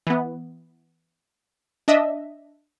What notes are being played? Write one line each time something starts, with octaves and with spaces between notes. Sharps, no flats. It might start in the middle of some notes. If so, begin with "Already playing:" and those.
E3 B3
D4 D#5 E5